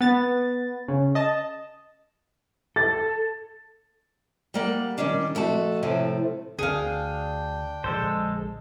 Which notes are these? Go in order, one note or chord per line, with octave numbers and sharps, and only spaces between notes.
B3 A6
C#3
D#5 A5
A4 A6
G3 A#3 F#5
D#3 G3 A3 C#4 D4
F2 A3 F#4 A5
A2 C3 F3 A3 C4
D2 D3 D4 G#4 F5 G5
A#1 D3 G#3 A4 C5